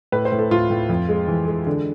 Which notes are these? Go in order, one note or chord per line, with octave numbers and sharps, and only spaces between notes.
A2 B4
C5
A2
A4
A2 F4
A2
F2
G#3
E3
G#3
D3